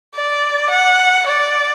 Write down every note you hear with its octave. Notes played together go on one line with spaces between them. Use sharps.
D5
F#5
D5